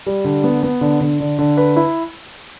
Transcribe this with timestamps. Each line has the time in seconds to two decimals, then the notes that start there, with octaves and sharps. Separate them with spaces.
0.07 G3
0.25 D3
0.44 B3
0.63 B3
0.81 D3
1.01 D3
1.20 D3
1.39 D3
1.57 B4
1.77 E4